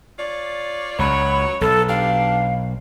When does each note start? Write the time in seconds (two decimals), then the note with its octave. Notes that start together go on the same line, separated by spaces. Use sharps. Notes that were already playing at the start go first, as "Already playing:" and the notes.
0.19 F4 C#5 D5
0.99 C#2 F#3 C#5 B5
1.61 B1 A4
1.89 D4 G4 F5